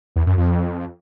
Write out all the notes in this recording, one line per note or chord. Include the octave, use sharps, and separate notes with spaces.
E2
F#2
F2